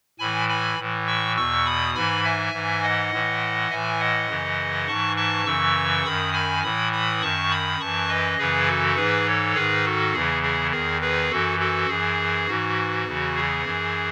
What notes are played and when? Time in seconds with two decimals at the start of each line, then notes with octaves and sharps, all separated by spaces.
0.19 A2 E3 G#5 B5
0.49 G#5 B5
0.78 A2 E3
1.07 C#6 E6
1.36 E2 B2 C#6 E6
1.66 B5 D#6
1.95 G#2 E3 G#5 B5
2.24 E5 G#5
2.53 G#2 E3
2.83 D#5 F#5
3.11 A2 E3
3.70 A2 E3 E5 G#5
4.00 D#5 F#5
4.29 F#2 C#3 E3
4.87 G#2 E3 A5 C#6
5.16 A5 C#6
5.45 F#2 C#3 E3 C#6 E6
6.04 F#2 D#3 B5 D#6
6.33 G#5 B5
6.63 A2 E3 B5 D#6
6.92 B5 D#6
7.22 F#2 D#3 A5 C#6
7.50 B5 D#6
7.79 F#2 E3 A5 C#6
8.08 B4 D#5
8.38 F#2 C#3 E3 G#4 B4
8.67 F#4 A4
8.96 G#2 E3 G#4 B4
9.26 A4 C#5
9.55 G#2 D#3 G#4 B4
9.85 F#4 A4
10.13 E2 C#3 E3 G#4
10.43 G#4
10.71 E2 D#3 G#4
11.01 G#4 B4
11.30 F#2 E3 F#4 A4
11.59 F#4 A4
11.88 F#2 E3 G#4
12.47 G#2 E3 F#4
13.05 E2 C#3 E3
13.35 G#4
13.64 F#2 E3